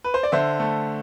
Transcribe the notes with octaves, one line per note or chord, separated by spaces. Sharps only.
B4
C5
D5
D3 C5 E5
A3